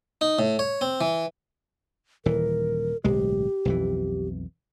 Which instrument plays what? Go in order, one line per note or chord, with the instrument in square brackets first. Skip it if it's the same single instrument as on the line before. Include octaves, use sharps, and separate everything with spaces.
[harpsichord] D#4
A2
C#5
C4
E3
[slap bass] D#1 E3 [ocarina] A#4
[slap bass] D1 B1 G#3 [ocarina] G4
[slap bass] B1 F2 E3